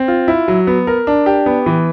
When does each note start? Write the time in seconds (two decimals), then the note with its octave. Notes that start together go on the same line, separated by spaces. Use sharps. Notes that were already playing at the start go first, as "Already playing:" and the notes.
Already playing: C4
0.08 F4
0.28 E4
0.48 F#3
0.67 B3
0.87 A#4
1.07 D4
1.26 G4
1.46 B3
1.66 E3